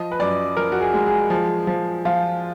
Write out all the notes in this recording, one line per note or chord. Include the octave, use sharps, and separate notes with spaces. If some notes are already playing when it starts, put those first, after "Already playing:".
Already playing: F3 D#5
B4
F#2 D5
F3 A#4
F#4
G#4
G#3
G#4
F3
F3
F3 F4